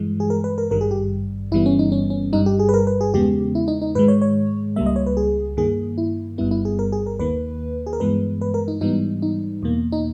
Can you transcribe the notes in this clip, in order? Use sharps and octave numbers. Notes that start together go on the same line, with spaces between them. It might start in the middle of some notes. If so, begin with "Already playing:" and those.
Already playing: G2 E3 G#3
G#4
A#4
B4
A#4
G#1 G2 D#3 G3 A#4
G#4
G4
G1 G2 E3 G3 B3 E4
C#4
D#4
C#4
C#4
G1 G2 G3 D#4
G4
G#4
B4
A#4
B4
G#4
E2 C#3 G#3 B3 G4
E4
D#4
D#4
G#2 D#3 G#3 B4
C#5
C#5
C#2 C#3 G3 A#3 E5
D#5
C#5
B4
G#4
G2 D#3 A#3 G#4
E4
G1 G2 G3 B3 E4
E4
G#4
A#4
G#4
A#4
D#2 D#3 A#3 B4
G#4
A#4
G2 E3 G#3 B3 B4
B4
A#4
D#4
G#2 E3 G3 B3 D#4
D#4
E2 B2 A#3
D#4